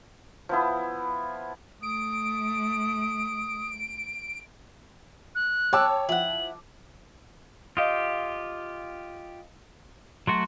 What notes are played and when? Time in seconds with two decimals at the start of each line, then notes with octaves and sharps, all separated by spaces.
0.49 F3 B3 E4
1.83 A3 D#6 D7
5.35 F#6
5.73 C#5 G5 A5 D6 E6
6.09 F3 E4 F#5 F#7
7.77 F4 G4 D#5 F5 D#6
10.27 F#3 A3 F#4 C6